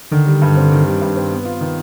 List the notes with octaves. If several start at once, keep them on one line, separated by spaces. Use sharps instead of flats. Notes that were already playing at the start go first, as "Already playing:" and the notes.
D3 D#3
G3
G2
C4
D#3
G3
G2
C4
B3
F4
D#3